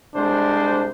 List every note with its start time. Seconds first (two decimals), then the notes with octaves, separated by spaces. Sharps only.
0.16 C2 G#3 D4 C5